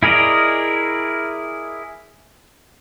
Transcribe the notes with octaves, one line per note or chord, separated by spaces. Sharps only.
E4 G#4 A#4 D5 D#5